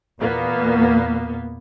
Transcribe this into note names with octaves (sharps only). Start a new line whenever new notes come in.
E2 A#2 A#3 B3